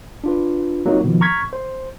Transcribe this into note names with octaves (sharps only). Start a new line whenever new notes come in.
D4 F4 B4
F#3 A#3 C4 D#4 F4
B2 D#3 F3
A#5 C#6 F6 G#6 B6
C5